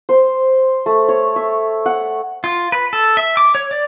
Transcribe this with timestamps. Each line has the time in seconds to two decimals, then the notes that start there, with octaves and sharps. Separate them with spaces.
0.09 C5
0.86 A3
1.09 C#5
1.36 E5
1.86 F#5
2.44 F4
2.72 B4
2.93 A4
3.17 E5
3.37 D6
3.55 C#5
3.71 D5